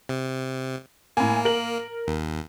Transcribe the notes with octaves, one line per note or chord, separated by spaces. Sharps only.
C3
A2 A#3 G#5
A#4 F#7
D#2